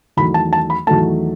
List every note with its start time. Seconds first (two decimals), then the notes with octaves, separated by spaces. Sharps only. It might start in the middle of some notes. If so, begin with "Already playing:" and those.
0.17 E2 D#3 F#3 A3 B5
0.34 A5
0.53 A5
0.70 B5
0.87 E2 D#3 F#3 A3 A5